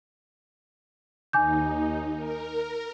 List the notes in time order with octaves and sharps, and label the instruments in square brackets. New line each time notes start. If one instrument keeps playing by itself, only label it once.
[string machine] D#2 D#4 [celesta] G#5 D6 G6
[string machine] A#4